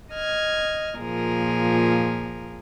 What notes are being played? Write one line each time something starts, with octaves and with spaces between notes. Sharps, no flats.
D#5 F6 G#6
A#2 F3 G#4 A#4